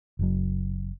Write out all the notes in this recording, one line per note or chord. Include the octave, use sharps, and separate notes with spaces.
F#1 F#3